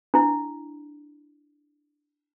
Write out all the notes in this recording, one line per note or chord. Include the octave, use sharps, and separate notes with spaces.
D4 E4